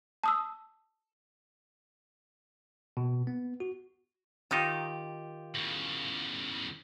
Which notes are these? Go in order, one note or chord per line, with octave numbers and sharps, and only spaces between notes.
A5 D#6 E6
B2
B3
F#4
D#3 D#4 F4 G4
E2 C#3